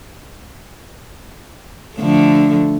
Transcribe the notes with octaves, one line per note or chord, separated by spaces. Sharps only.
D3 F3 A3